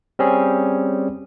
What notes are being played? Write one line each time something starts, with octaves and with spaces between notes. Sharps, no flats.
G3 C4 C#4 G#4